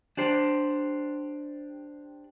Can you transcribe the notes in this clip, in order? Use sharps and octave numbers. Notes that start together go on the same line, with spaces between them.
D4 G4 C5